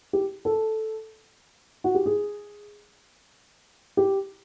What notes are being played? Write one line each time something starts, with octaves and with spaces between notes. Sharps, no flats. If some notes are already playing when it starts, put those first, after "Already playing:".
G4
A4
F#4
G4
G#4
G4